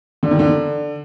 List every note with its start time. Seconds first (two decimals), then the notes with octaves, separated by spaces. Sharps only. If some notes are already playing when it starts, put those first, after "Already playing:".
0.23 D3
0.31 D#3
0.39 D3